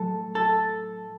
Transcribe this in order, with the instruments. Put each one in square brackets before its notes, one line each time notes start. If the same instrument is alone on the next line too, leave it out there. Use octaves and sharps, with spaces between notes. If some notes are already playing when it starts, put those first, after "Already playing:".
Already playing: [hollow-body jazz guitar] A2 F#3 A4
A4